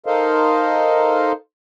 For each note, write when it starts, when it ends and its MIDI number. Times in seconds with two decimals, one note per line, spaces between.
0.06 1.32 63
0.06 1.32 69
0.06 1.32 70
0.06 1.32 72
0.06 1.32 75
0.06 1.32 77